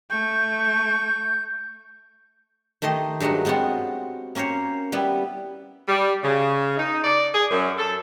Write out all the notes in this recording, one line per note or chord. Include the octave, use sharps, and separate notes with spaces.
A3 C#6 G6
D#3 A3 G4 D#5 C6
G2 F#3 G#3 A3 F#4
G#3 B3 C4 F4 F#4
A#3 C#4 A#4 C5 C#5
G3 B3 E4 B4
G3
C#3
D#4
D5
G#4
F#2
A4